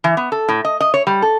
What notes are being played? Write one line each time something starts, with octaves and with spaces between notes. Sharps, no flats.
E3
B3
A4
A2
D#5
D#5
C#5
G3
A4